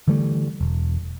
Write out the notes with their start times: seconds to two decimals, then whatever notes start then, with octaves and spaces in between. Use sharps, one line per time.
0.08 D3 E3 G3 A3
0.61 E1